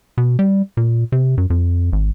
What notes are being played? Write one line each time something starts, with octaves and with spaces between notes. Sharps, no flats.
B2
G3
A#2
C3
F#2
F2
G#1